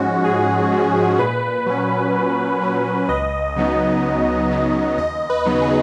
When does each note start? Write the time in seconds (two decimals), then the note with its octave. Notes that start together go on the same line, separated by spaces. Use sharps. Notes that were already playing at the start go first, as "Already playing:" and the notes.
Already playing: G#2 F3 G#3 C#4 F#4
0.24 G#2 G#4
0.72 F3 G#3 C#4
1.19 A#2 B4
1.66 F#3 C#4
2.14 A#2
2.61 F#3 C#4
3.09 C#2 D#5
3.56 C#3 F#3 B3 D#4
4.04 C#2
4.51 C#3 F#3 B3 D#4
4.98 D#2 D#5
5.30 B4
5.45 C#3 F#3 B3 D#4
5.61 G#4